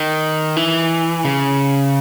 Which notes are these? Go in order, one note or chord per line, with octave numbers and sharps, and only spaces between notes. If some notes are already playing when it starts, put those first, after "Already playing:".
Already playing: D#3
E3
C#3